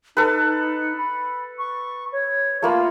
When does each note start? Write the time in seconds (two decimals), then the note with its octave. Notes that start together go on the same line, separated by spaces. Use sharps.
0.17 D#4 A4 B4
0.97 B5
1.58 C#6
2.12 C#5
2.62 A3 A#3 F4 B5